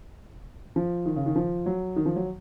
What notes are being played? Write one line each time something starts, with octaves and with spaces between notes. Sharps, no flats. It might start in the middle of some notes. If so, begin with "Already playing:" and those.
F3
D#3
C#3
D#3
F3
F#3
D#3
F3
F#3